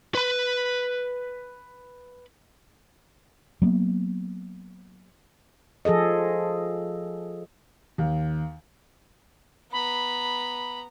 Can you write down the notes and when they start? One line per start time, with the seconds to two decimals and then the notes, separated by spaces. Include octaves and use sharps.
0.15 B4 B5
3.62 F#3 A#3 B3
5.85 F3 G#4 A4 D#5
7.98 D#2
9.72 B3 A#5 B5